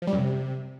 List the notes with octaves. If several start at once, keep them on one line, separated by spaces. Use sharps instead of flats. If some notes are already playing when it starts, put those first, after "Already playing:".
F3
G3
F#2
C3